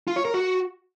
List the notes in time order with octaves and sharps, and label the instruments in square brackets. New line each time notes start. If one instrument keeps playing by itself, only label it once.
[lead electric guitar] F4
C#5
A#4
F#4